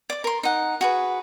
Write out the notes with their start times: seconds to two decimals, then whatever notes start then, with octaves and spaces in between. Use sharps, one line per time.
0.10 D5 D6
0.24 A#4 C6
0.43 D#4 F#5
0.81 F#4 G#4 B4